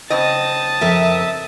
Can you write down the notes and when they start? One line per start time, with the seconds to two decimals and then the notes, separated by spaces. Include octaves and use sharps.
0.10 C#3 C4 D#5 A5 D#6
0.81 F2 A#4 E5